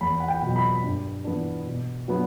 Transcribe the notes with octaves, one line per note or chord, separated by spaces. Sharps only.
E2 B5
F#5
G5
B2 F#3
B5
G2
E3 B3 D4
B2
F#3 B3 D4